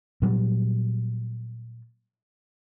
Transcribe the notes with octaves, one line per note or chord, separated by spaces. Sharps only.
A#2 F#3 G3